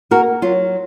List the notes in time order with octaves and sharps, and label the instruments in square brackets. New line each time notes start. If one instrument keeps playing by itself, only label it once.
[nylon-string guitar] A#3 F#4 A#4
F#3 F4